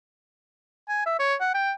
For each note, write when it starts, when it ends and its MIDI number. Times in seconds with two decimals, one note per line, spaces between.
0.89 1.03 80
1.06 1.19 76
1.19 1.35 73
1.40 1.51 78
1.54 1.72 79